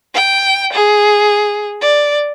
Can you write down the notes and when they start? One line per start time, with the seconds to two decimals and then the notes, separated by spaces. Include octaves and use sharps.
0.14 G5
0.73 G#4
1.81 D5